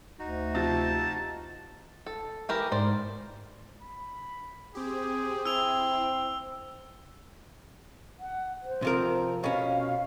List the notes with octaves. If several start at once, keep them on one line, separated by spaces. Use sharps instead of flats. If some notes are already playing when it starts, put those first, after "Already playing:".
D2 D#4 F#4
C3 F3 F4 A5
A4
E3 G4 A#4
G#2 C5 D5
B5
C4 G4 G#4
C4 E4 E6 F7
F#5
C5
C3 F3 A#4
B2 C#4 F5